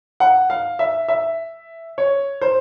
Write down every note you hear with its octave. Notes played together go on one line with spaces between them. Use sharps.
F#5
F5
E5
E5
C#5
C5